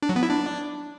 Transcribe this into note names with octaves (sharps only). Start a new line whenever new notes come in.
D4
F#3
B3
E4
D4